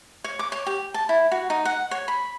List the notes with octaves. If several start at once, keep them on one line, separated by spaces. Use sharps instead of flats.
C#5
D6
C#5
G4
A5
E4
F#4
D#4
F#5
C#5
B5